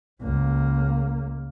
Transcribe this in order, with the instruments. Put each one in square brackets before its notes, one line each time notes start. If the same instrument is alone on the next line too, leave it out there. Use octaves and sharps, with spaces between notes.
[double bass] C#2 A#3